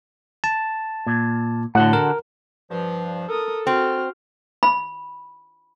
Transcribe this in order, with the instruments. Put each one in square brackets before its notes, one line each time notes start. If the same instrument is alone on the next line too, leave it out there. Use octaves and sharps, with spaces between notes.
[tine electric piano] A5
[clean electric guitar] A#2
[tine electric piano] A2 [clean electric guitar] D3 F#4 F#5
[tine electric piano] A#4
[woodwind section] G2 F3
[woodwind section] A4 [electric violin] A#4 D#6
[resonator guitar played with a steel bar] C4 [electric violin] F#4 F6
[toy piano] B5